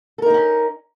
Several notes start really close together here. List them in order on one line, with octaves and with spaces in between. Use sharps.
A4 A#4 D#4 C4 C#4